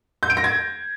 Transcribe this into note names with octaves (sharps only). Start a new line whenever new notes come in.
G6
D7
A#6
G#6